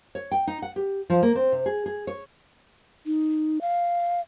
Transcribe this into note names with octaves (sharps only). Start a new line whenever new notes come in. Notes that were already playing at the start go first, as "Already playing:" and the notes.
C#5
G5
D#4
F#5
G4
F3
A#3
C4
C3
G#4
G#4
C#5
D#4
F5